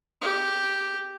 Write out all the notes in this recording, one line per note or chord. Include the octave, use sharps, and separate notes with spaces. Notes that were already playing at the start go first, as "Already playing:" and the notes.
G4